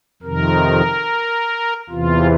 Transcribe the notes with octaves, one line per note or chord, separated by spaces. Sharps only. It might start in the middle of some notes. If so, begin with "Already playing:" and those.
F2 C3 D#3 A#4
E2 C3 E3 F4